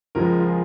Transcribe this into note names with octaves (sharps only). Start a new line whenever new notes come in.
C#2 C#3 F3 G#3 A#4
F4
G#4